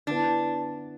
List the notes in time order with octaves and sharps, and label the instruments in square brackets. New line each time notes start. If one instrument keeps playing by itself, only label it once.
[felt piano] D3 B3 E4 [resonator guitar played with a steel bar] D4